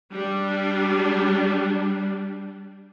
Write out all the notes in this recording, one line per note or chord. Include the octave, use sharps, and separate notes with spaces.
G3 D4